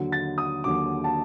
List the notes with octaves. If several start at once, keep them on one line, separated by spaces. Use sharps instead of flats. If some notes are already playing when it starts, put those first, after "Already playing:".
Already playing: D#2 D3 F#3
A6
D#6
D#2 D3 F#3 D6
A5